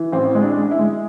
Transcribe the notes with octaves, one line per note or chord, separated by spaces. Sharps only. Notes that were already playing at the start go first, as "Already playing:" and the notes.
Already playing: E3
A1 C4
G#3
D4
G#3
E4
G#3